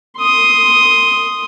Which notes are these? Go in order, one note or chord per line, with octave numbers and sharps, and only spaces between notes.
C6 D#6